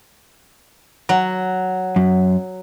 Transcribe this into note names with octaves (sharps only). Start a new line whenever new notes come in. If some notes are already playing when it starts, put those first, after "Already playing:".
F#3
F#2